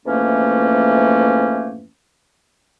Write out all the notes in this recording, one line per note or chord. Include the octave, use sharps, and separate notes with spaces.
F2 G#2 E3 A3 A#3 C#4